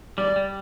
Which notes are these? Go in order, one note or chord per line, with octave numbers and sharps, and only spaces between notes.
G3 D5
G3